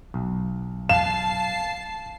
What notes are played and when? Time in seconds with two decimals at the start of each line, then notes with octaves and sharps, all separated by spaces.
0.14 B1
0.89 F5 A5 C7 E7